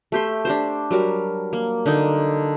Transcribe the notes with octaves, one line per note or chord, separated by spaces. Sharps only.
A3 G4 C6
D4 G4 C5
F#3 G3 A#4
A#3
D3 A#3 D#4